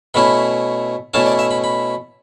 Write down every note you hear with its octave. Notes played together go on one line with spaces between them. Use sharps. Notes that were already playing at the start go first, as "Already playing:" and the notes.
B2 A3 C#4 E4 B5
B2 A3 C#4 E4 A5
D5
E5
B5
B5